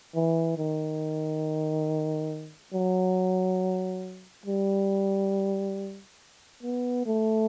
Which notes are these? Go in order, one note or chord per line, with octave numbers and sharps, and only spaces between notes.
E3
D#3
F#3
G3
B3
A3